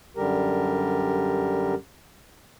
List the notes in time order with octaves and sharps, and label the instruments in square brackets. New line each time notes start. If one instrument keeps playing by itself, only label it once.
[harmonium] F#2 D3 G3 G4 A#4